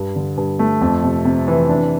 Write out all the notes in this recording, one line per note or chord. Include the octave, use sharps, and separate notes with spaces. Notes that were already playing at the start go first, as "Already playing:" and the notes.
Already playing: G2
D3
G2
A3
F2
C3
C3
E3
D4